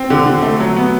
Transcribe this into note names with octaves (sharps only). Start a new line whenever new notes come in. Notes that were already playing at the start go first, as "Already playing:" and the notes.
Already playing: C4
D3
D3
A3
F#3
B3